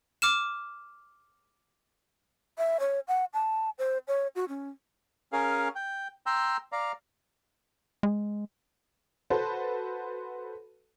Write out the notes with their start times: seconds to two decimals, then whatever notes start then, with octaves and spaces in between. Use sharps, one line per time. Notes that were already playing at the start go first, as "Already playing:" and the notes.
0.22 D6 F6 E7
2.58 E5
2.80 C#5
3.08 F#5
3.34 A5
3.79 C5
4.08 C#5
4.36 F#4
4.49 C#4
5.33 C#4 G#4 A#4 F5
5.75 G5
6.26 G5 A#5 C6 E6
6.72 D5 F5 A#5
8.03 G#3
9.30 F#4 A4 B4 C5 A5